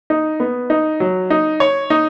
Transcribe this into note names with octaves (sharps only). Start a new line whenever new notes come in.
D#4
B3
D#4
F#3
D#4
C#5
D#4